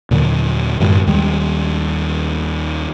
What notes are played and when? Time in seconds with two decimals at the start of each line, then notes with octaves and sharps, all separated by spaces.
0.11 D#2 A#2 D3 F#3
0.80 F#2 A2 D#3 G#3
1.07 D#2 D#3 G3 G#3